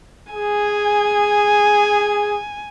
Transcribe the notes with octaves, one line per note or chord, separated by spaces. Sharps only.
G#4 G#5